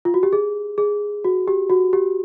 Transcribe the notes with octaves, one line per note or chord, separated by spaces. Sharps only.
F4
F#4
G4
G#4
G#4
F#4
G4
F#4
G4